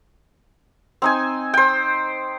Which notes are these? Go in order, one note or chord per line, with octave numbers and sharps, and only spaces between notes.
C4 D#4 G#5
C5 G5